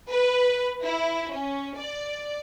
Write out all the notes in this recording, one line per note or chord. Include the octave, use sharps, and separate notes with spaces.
B4
E4
C#4
D5